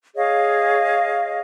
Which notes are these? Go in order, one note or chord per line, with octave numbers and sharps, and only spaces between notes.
G#4 C#5 D#5 F5